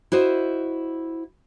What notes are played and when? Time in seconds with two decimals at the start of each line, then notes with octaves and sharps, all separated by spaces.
0.12 E4 F#4 C5 D#5